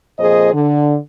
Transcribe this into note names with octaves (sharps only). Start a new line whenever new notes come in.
F2 A#2 F3 G#4 C5 D#5
D3